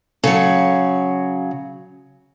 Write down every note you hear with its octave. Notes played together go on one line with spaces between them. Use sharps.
C#3 F#3 A4